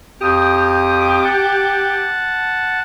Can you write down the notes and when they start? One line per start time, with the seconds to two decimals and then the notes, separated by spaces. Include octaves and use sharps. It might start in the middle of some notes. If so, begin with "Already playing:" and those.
0.21 F2 G4 D#6
1.24 F#5 A5